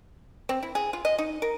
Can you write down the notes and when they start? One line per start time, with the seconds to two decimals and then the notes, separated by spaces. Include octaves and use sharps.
0.49 C4
0.63 E4
0.75 G#4
0.93 F4
1.05 D#5
1.18 D#4
1.42 A#4